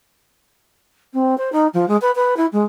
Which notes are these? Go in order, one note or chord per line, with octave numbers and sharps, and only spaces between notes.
C4
C5
D#4
F3
G#3
B4
B4
E4
G#3